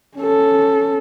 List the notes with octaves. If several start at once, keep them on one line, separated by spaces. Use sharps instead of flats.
C#4 A4